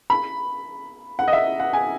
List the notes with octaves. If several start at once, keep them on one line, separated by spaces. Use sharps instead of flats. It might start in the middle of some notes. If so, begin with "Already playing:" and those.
B5
F#5
D#5
E5
F#5
G#5